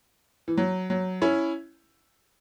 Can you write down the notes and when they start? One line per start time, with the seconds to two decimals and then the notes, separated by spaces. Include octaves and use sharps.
0.48 E3
0.57 F#3
0.90 F#3
1.22 C#4 E4